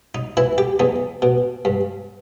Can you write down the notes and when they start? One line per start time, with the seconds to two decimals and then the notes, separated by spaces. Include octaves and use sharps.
0.15 D#4
0.37 E3 E4
0.58 G4
0.79 E2 D#4
1.22 B2
1.65 G2